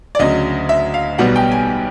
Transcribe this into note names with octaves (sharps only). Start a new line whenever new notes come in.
D5
D2 C#3 F#3 D#5
E5
F5
B1 B2 G3 B3 F#5
G5
G#5